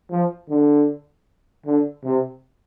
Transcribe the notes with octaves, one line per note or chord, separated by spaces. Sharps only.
F3
D3
D3
C3